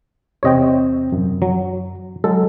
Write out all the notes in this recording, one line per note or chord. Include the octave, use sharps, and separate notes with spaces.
E2 C3 C4 C#5 D#5 G5
F#2
F#3
F#3 G#3 A4